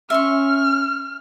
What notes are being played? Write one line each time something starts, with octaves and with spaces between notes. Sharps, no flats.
C#4 E5 C6 C#6 F6